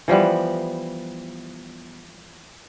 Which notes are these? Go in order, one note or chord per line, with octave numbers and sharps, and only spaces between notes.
E3 F3 G3 B3